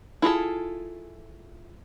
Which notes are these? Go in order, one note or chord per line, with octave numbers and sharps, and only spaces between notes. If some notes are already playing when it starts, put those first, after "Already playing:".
E4 F4 G#4 A4